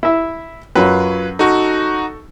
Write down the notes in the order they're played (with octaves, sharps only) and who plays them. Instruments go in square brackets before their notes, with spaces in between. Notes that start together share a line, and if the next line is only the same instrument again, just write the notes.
[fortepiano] E4 E5
[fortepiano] F#2 [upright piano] F#3 F4 C#5 [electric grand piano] B4
[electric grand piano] D#4 F#4 [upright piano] A4 C#6